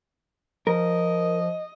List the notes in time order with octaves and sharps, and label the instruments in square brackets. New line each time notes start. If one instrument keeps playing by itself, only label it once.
[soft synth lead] F3 [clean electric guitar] A#4 [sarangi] D#5